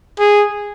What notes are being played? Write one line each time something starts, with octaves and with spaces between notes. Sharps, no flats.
G#4